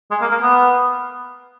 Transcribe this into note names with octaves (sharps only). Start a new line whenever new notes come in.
G#3
A#3
A#3
B3